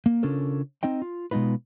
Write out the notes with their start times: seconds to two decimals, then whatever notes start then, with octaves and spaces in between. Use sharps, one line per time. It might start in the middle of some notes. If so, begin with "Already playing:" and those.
0.06 A#3
0.23 C#3 C#4 D4 F4 A4 A#4
0.83 C4 D#4 D#5 G5
1.02 F4
1.31 B2 G#3 B3 D#4 F4 B4